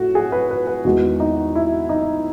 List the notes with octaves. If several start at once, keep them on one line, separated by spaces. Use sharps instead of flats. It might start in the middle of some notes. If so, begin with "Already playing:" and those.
Already playing: A2 A3 F#4
G#4
B4
B4
B4
E2 D#3 G#3 B3 F#4
D#4
E4
D#4